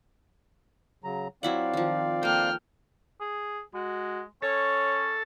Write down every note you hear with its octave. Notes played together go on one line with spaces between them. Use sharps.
C#3 F#3 A#5
F#3 C4 E4 D5 F5 F#5
D#3 F3
A#3 A4 G5 F6
G#4
G#3 F#4
C#4 A4 C#5